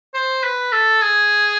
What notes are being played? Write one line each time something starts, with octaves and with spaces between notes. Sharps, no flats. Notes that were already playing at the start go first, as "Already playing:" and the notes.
C5
B4
A4
G#4